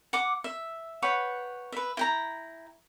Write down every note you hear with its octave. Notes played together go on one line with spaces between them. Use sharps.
F#5 D6
E5
B4 C#5 F#5 G5
B4 E5
E4 G5 A#5